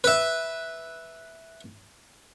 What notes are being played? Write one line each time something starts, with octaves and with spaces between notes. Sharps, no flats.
B4 E5